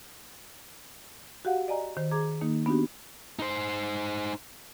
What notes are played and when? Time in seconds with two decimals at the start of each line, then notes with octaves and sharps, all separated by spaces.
1.45 F#4 G4 F5 F#5
1.68 D5 D#5 G#5 A#5
1.97 D#3 C5
2.11 G#4 A#5 D6 G#6
2.41 D#3 A#3 D#4
2.66 B3 D4 D#4 F#4 G4
3.39 D#4 C5